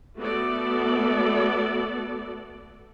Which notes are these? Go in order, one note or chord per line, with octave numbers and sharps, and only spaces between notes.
A3 B3 F#4 A4 D5